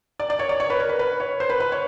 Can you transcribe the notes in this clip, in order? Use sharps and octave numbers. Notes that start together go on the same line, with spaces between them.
D5
D5
C#5
D5
C#5
B4
A#4
B4
B4
C#5
C5
B4
B4
C#5